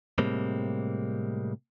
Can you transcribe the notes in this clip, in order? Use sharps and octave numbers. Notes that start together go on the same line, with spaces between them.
A2 C3 G3 G#3 A#3 C4